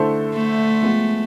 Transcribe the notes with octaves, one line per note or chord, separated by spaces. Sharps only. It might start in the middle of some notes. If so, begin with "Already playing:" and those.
Already playing: D3 A3 E4 A4 C5
A3
F3 G#3 B3